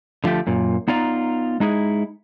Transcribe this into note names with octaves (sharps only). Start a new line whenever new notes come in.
D3 F3 A3 G4
F#2 A#2
B3 D#4 F4 D5 A#5
G#3 D#4 E4 G#4